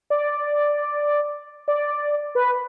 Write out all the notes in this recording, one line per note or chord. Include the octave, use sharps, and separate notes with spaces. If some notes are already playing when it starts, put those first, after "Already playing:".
D5
D5
B4